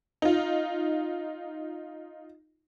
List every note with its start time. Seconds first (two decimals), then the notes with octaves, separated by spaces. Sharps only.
0.22 D#4 F4